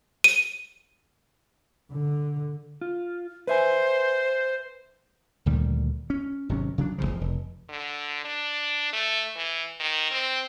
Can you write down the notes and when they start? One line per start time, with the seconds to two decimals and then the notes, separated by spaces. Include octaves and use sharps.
0.24 D#7
1.92 D3
2.81 F4
3.47 B4 C5 E5 G#5
5.46 D2 A#2 D#3 G3
6.10 C#4
6.49 G#1 C3 F#3 C#4
6.78 C#3 F#3 D4
6.98 E1 C#2 C#3 F3
7.21 F1
7.69 D3
8.25 D4
8.93 A3
9.36 E3
9.80 D#3
10.11 C4